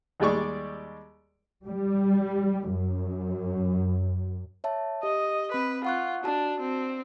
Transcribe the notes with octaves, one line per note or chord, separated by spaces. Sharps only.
D#2 G3 G#3 D5 C#6
G3
F#2
C#5 E5 A5
G4 D#5
C4 B4 B5
F4 F#5 C#6 F#6
D4 F#4 A5
C4